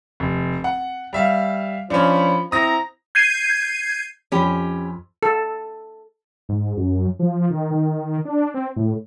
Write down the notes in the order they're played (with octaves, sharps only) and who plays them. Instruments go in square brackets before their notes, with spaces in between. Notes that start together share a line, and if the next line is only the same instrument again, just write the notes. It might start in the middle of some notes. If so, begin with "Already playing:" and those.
[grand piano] F1
F#5
G3 E5 F5
[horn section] F3 B5 [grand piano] C#4 D4
[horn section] C4 E4 A#5 [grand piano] D#6 A#6
[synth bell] G6 G#6 C7 D#7
[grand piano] F2 B5 [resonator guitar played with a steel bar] C#4 G4
[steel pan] A4
[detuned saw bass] G#2
F#2
F3
D#3
D#3
D4
C4
A2